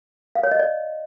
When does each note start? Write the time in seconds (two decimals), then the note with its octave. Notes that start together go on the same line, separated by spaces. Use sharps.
0.35 F5
0.43 C#5
0.51 D#5
0.59 D5